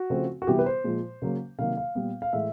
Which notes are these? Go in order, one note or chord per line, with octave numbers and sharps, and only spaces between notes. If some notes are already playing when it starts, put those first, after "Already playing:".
Already playing: F#4
C#3 F3 A3 C4
F#4
C3 E3 G3 B3 G4
B4
C5
A#2 F3 G#3
C#3 F#3 A#3
C3 D#3 F#3 A#3 F5
F5
A#2 G3 B3
F5
A2 E3 G#3 E5